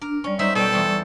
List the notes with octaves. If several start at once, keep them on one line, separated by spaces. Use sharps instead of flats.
D4 A#4
G3 C#4 D5 C#6
F#3 D#4 C5 E5
B2 A4 G5
E2 C5